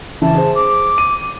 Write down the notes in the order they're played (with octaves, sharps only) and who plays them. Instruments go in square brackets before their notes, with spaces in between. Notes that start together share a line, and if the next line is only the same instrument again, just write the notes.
[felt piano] C#3 E3 [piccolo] A5
[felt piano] G#4 C5
[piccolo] D6
[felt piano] D#7